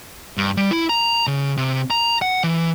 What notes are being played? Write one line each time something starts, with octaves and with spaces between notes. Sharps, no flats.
G2
G3
E4
A#5
C#3
C3
A#5
F#5
E3